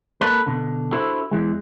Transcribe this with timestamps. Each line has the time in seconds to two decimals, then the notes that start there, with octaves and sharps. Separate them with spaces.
0.21 A#3 A4 B4
0.46 B2 D3
0.92 D4 E4 F#4 A4 C5
1.31 E2 E3 G#3